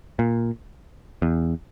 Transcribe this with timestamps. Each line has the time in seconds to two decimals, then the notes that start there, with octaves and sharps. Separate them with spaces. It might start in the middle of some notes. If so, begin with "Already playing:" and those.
0.19 A#2
1.22 E2